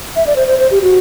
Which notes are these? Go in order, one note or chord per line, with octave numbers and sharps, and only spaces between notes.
E5
D5
C5
C5
C5
G4
F#4